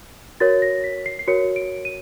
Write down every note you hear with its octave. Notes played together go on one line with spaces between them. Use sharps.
F#4 A#4 C#5 A6
A#6
B6
C7
C7
F#4 A#4 C#5 C#7
D7
D#7